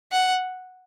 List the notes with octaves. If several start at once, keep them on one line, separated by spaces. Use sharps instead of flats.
F#5